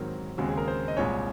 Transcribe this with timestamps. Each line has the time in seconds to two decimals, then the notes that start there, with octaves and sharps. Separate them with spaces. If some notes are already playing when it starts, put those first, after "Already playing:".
Already playing: G#2 D#3 F#3 C4 A#4
0.38 D#2 C#3 G#3 C4 F#4
0.49 G#4
0.58 A#4
0.68 C5
0.88 D#5
0.97 C2 A#2 G#3 C#5